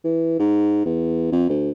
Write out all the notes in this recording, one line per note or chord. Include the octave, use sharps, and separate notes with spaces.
E3
G#2
E2
F2
D2